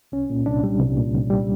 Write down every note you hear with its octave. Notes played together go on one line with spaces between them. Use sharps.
C2 C#4
A#2
C2 D4
G3
C2
A#2
C2
G3